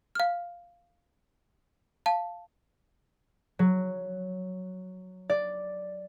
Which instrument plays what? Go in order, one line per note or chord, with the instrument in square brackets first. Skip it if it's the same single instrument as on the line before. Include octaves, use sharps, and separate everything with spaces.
[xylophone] F5 F6
F5 A5
[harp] F#3
D5